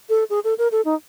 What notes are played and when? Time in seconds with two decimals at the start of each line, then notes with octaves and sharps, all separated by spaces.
0.09 A4
0.30 G#4
0.44 A4
0.58 A#4
0.72 A4
0.85 D#4